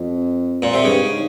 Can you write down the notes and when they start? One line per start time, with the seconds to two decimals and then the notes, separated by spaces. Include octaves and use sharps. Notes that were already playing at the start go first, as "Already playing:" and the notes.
Already playing: F2
0.62 A#2
0.73 C3
0.84 G2 C#3
1.02 G#2